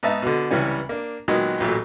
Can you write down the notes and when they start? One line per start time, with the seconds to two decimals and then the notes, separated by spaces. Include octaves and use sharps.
0.03 G#2 B3 D#4 E5 A5
0.22 B2 D3
0.51 C#2 C3 E3 G3 C#4
0.89 A#3 D4
1.28 A#2 D#3 F#3 G#3 B3
1.60 A1 A#2 F#3 A3